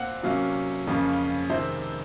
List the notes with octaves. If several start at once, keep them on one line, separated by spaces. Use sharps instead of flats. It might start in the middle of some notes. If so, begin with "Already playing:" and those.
Already playing: A#2 C4 F5 F#5
C3 F#3 A#3 C#4 F5
F2 C#3 F3 A#3 C#4
C3 D#3 G#3 C4 C5